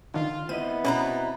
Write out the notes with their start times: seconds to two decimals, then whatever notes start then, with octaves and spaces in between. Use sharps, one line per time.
0.14 D3 D#3 F4
0.49 B3 C4 E4 D#5 D#7
0.85 B2 C#4 B4 A#5